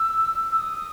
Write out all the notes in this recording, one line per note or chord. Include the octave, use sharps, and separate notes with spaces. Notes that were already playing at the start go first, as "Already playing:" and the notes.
Already playing: E6
E6
D#6